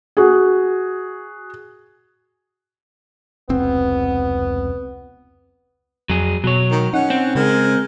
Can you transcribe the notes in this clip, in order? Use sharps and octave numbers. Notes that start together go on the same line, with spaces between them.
F#4 G#4
F1 C#2 B3 C4
F2 F#3 G#4
B2 F#3 C#5
D#3
C#4 D#4 F#5
C4
C#3 G#3 A#4